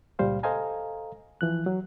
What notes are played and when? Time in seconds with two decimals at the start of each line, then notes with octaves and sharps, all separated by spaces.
0.19 C#2 A#2 G3 C5 F5
0.43 A4 C5 D#5 F5 G#5 A#5
1.41 E3 F3 F#6
1.66 F#3